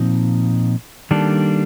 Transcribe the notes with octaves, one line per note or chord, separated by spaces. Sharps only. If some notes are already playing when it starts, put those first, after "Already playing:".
Already playing: A#2 F3 C4 D#4
D#3 G3 A#3 D4 A4